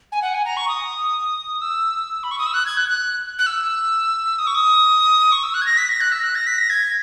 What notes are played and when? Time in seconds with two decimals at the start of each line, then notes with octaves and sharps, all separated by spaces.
0.12 G#5
0.22 F#5
0.34 G#5
0.45 A#5
0.57 C#6
0.68 D#6
1.61 E6
2.23 B5
2.31 C#6
2.39 D#6
2.46 E6
2.54 F#6
2.66 G#6
2.77 F#6
2.88 F#6
3.39 F#6
3.46 E6
4.39 D#6
4.47 C#6
4.55 D#6
5.32 C#6
5.43 E6
5.54 F#6
5.62 G#6
5.66 A#6
5.78 B6
5.89 A#6
6.01 F#6
6.12 E6
6.24 F#6
6.35 A#6
6.47 B6
6.58 A#6
6.70 G#6